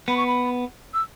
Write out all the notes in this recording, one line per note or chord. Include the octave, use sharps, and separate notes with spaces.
B3 B5
C#6
B5
E6